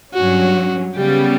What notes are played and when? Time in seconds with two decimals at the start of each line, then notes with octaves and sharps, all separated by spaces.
0.14 G2 F#3 C#4 F#4
0.95 C#3 G3 B3 G4